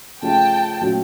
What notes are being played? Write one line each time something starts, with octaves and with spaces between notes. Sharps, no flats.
C#3 F3 A3 C#4 F4 G5 A5
A#2 F#3 A3 C#4 F#4